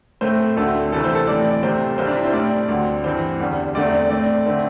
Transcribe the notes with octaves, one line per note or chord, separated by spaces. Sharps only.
A2 A3 C4 C5
D2 D3 A3 C4 A4
C2 C3 E3 A3 A4
C5
A4
A2 E3 C4 D5
D5
C2 C3 A3 C4 C5
C2 C3 G3 C4 C5
D4
E4
C5
A2 G3 C4 D5
D2 D3 C4
G2 E3 C4 C5
E2 D3 G3
E2 D3 A3 C4 D5
A2 A3 C4 D5
D3 A3 C4